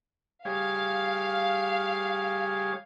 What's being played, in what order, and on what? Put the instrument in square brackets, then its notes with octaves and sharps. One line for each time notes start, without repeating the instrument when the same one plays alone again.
[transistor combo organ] G3 G#4 C#5 [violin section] F5